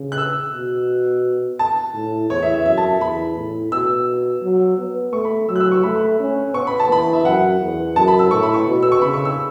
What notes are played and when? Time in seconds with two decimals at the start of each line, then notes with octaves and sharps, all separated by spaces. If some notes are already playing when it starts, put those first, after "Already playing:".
Already playing: C#3
0.12 F#6
0.18 E6
0.54 B2
1.59 A5
1.95 A2
2.30 E2 C#5
2.42 E5
2.54 E5
2.66 F#2 E5
2.77 A5
3.01 E2 B5
3.36 A2
3.72 B2 E6
4.42 F#3
4.78 B3
5.13 A3 C#6
5.25 B5
5.49 F#3 E6
5.56 F#6
5.60 E6
5.72 C#6
5.83 A3 B5
5.95 B5
6.19 C#4
6.54 B3 C#6
6.67 B5
6.80 A5
6.90 E3 B5
7.13 E5
7.25 F#2 F#5
7.60 E2
7.96 F#2 A5
8.08 B5
8.19 E6
8.31 A2 C#6
8.43 B5
8.54 C#6
8.66 B2
8.83 E6
8.92 C#6
9.02 C#3 B5
9.14 C#6
9.25 E6